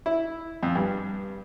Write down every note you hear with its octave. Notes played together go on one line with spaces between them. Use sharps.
E4
F2
G2